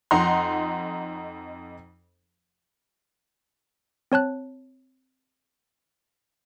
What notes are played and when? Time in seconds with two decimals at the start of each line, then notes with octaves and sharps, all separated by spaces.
0.11 F2 D#4 F#5 A#5 C6
4.12 C4 C#5 A5 F#6